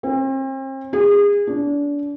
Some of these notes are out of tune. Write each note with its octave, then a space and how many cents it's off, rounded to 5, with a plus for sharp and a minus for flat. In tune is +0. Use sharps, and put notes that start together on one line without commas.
C4 +40
G#4 -30
D4 -30